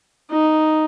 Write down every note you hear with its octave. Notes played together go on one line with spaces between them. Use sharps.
D#4